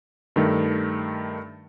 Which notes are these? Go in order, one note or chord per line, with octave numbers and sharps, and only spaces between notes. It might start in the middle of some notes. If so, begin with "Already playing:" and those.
G2 D#3 A3